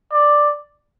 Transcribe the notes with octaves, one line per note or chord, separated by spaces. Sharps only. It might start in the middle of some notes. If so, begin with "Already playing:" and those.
D5